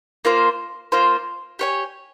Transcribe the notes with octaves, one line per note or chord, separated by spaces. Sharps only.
A#3 F4 C5
A#3 F4 C5
G4 C#5 G#5